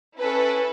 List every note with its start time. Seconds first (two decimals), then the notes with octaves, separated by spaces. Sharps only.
0.17 C#4 E4 A4 B4